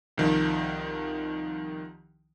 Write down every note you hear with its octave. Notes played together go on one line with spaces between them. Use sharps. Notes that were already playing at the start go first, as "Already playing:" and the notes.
C2 D#3 F3